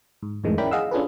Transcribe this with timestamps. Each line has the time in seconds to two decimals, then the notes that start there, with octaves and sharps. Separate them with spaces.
0.23 G#2
0.44 F2 A2 D#3 E3 G#3
0.58 C#4 E4 A#4 D5 G5 B5
0.71 G#4 D#5 F5 F#5 E6
0.91 C#4 D4 F4 G#4 A4 B4